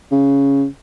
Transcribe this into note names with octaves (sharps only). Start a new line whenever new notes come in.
C#3